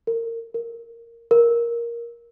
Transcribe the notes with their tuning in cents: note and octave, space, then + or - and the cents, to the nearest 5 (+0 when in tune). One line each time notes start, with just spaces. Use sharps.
A#4 -25
A#4 -5
A#4 +10